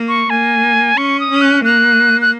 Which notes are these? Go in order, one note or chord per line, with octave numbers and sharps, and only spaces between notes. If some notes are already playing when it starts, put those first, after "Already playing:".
Already playing: A#3
C#6
A#3 G#5
C#4 C#6
D#6
C#4
F#6
A#3 F#6
F#6